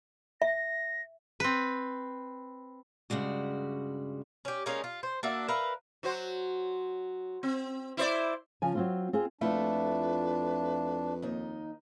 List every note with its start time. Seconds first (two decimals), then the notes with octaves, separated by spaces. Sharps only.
0.42 E5 A#6
1.40 C4 B4
3.10 G2 C#3 G3 G#3 F#4
4.45 C#4 G4
4.66 G#3 A#3 C#4 D#4
4.84 F4
5.03 C5
5.23 A#3 D4 F#4 E5
5.48 A#4 B4 E5 F5
6.03 F#3 F#4 C5
7.43 C4
7.97 E4 C5 D5
8.62 C#3 F3 G#5
8.75 F#3 C4 F4
9.13 C4 F4 G#4
9.41 F2 A3 D4 E4 F4 B4
11.22 D#2 D#4